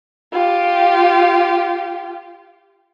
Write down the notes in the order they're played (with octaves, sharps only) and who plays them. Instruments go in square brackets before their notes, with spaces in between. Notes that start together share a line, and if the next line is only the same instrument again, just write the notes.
[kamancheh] F4 G4